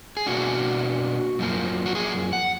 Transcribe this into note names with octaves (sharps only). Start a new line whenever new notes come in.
G#4
B2 A#3 D4 F#4
F#2 F3 A#3
F#4
G#4
F#5